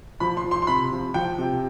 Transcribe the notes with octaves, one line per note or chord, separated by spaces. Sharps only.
F3 B5
C6
F3
C6
C6
C3 B5
F3
F3 G5
C3